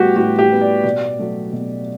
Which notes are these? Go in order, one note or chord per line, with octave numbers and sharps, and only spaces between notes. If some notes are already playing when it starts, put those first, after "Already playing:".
Already playing: A2 G3 B3 F#4 G4
A2 F#4
G4
G3 B3
D5
B2 D5
F#3 A3
B2